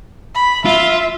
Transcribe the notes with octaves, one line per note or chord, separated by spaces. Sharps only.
B5
F4 E5